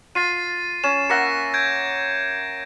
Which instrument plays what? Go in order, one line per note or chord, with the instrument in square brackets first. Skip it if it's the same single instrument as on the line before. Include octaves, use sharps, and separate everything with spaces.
[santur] F4 [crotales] A6 C7 D#7
[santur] C#4 [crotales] E7
[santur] A#3 E5 F#5 [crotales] A#6 C#7
[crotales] G6 G#6 D7